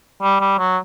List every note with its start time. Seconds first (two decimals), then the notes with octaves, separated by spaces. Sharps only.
0.22 G3
0.41 G3
0.58 F#3